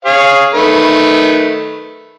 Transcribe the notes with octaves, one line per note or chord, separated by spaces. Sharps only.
G#4 C#5 F5
D#3 A3 B4